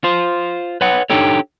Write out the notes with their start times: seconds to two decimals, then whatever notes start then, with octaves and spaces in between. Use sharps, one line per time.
0.04 F4 C5
0.81 B4 C#5 F#5
1.10 D4 D#4 G4 A4 C#5